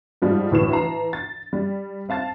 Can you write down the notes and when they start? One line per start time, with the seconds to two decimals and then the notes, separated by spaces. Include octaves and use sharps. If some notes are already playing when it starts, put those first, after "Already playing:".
0.22 G#2 F3 G3
0.50 D2 A2 E3 E7
0.73 E3 A5 A#5 C7
1.13 A6
1.53 G3
2.09 C4 F5 A5 A6